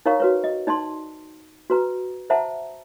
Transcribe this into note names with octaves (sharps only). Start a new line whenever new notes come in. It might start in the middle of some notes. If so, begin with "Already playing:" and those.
D#4 A#4 C#5 F5 A#5 C#6
F#4 B4 C#5
D#5
D#4 D5 A5 C6
F#4 B4 A#5
C5 E5 F#5 A5 A#5